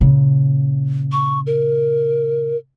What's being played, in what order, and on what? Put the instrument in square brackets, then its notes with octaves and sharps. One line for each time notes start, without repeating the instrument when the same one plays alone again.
[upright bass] A#2 C#3
[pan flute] C#6
A#4